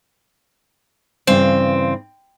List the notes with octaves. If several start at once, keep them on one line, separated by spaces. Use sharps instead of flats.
G2 C#3 E3 C4